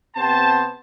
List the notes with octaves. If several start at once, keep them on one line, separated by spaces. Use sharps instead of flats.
C3 B3 C4 C5 A5